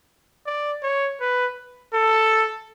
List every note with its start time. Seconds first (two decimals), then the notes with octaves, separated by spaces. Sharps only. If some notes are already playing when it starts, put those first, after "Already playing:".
0.46 D5
0.83 C#5
1.21 B4
1.93 A4